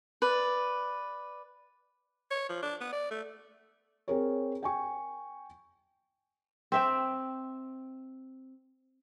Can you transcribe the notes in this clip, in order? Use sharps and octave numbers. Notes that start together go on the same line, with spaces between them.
B4 D5
C#5
F3
D4
B3
D5
A3
C4 G#4 A#4 C#5
G5 G#5 C#6
C4 E5 G5